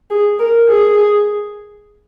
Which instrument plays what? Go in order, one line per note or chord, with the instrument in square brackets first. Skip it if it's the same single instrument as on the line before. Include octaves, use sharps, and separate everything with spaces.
[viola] G#4
A#4
G#4